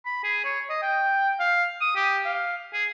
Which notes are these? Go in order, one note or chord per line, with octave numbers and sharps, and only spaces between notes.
B5
G#4
C#5
D#5
G5
F5
D#6
G4
F5
G#4